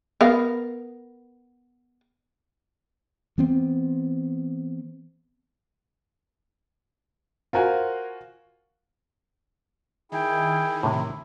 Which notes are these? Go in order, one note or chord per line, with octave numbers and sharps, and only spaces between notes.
B3 A#4 F5
E3 B3 C4
F4 F#4 A#4 C5 G#5
D#3 E4 G#4 G5
A2 C3 E4